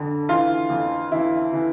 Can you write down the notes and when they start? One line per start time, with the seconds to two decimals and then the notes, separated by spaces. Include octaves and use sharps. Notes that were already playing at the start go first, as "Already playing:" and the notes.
Already playing: F2 D3
0.29 E3 F4
0.70 F2
1.12 E3 E4
1.53 E3